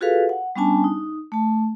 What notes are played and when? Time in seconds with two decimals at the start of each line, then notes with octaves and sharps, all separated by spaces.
0.01 F4 F#4 G#4 A4 B4 F5
0.29 F#5
0.56 G3 B3 C#4 D4 G#5 A5
0.84 D#4
1.32 A3 A5